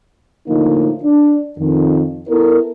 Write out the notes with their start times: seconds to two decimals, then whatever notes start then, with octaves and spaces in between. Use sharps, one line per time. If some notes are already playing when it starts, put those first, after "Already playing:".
0.47 A2 D3 F3 A#3 D#4
1.03 D4
1.58 F2 D#3
2.28 B3 E4 A4 A#4